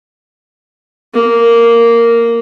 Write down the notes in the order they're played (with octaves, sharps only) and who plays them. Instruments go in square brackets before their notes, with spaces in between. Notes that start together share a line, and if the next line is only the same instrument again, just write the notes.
[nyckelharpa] A#3